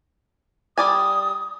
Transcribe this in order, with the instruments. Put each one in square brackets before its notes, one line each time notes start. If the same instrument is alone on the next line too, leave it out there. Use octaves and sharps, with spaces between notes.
[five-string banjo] G3 D5 G#5 [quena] D#6